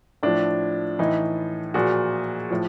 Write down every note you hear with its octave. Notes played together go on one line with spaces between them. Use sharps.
A2 F3 D4
A2 E3 D#4
A#2 F3 F#4 G#4
A2 F3